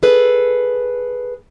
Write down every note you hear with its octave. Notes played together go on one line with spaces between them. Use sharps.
G#4 A4 B4